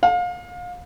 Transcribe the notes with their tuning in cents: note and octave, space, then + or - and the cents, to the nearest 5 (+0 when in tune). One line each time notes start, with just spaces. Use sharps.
F5 +30